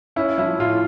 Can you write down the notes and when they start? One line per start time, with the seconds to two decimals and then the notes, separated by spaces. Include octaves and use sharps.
0.16 C#4 E4
0.38 F3 E4
0.59 A2 F4